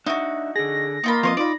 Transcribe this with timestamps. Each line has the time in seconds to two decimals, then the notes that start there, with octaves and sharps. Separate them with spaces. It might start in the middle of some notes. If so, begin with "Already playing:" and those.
0.06 D4 D#4 F#4 E5
0.56 D3 G#4 A#6
1.04 A#3 D#4 F4 B5
1.23 F3 C4 F4 C#5 D#5
1.37 D#4 F4 D5 B5